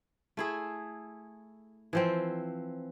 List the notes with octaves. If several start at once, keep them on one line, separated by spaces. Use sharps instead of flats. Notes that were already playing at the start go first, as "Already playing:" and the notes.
A3 E4 G#4
E3 F3 C4